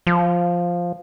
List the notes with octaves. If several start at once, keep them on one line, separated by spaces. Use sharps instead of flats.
F3